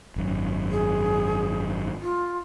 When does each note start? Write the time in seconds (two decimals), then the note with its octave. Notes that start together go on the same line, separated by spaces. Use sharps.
0.16 G#1 F#2
0.71 G#4
2.01 F4